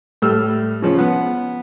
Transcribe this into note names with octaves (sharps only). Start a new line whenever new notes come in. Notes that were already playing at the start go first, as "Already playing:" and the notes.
A2 G3 E6 F6
C#3 F3 C#4
B3